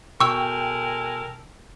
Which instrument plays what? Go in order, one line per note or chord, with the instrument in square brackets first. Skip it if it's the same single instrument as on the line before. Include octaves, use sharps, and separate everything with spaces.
[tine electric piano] B2 [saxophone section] G#3 A4 A#4 [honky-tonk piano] G5 [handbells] C#6 E6